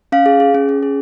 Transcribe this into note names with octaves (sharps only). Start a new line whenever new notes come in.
C#4 F5
G#4
G#4
C#4
C#4
G#4